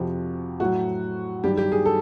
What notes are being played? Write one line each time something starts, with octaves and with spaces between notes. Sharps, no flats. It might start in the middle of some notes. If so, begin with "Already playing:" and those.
Already playing: F2 C3 F3 F#4
A2 F#3 F#4
G2 D#3 F#3 G4
G4
G#4
A4